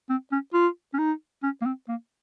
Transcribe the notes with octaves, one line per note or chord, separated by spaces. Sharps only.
C4
C#4
F4
C#4
D#4
C#4
A#3
C4
A#3